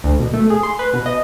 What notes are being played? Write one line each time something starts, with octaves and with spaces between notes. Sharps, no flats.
D2
B2
A3
G#4
C6
B4
B2
D#5